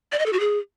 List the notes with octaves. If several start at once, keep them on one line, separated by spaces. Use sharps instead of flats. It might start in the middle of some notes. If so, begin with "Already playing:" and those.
D5
D#5
A4
F#4
G#4